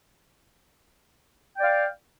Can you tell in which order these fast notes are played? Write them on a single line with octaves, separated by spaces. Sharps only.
G5 D5 F5